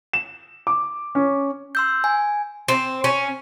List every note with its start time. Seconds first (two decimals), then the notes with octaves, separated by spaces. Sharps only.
0.13 E7
0.67 D6
1.15 C#4
1.75 C6 E6 G6
2.04 G#5
2.68 C4
3.04 C#4